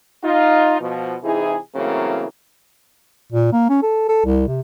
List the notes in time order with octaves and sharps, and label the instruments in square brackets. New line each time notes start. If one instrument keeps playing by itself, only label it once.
[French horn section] D#4 F4
B2 F3
C3 E3 D#4 E4 G#4
C#3 E3 F#3 A3 A#3 C4
[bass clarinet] A#2
A#3
C#4
A4
A4
C2
C3